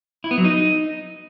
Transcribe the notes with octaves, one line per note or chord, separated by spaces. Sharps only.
E4
B3
F#3
D#4